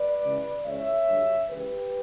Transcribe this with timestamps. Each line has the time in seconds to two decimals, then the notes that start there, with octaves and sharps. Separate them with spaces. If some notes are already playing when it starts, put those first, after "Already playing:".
Already playing: B4 D5
0.23 C#2 C#3 E3
0.65 C#2 C#3 E3 C#5 E5
1.07 G2 D3 F#3
1.50 C#2 C#3 E3 G4 B4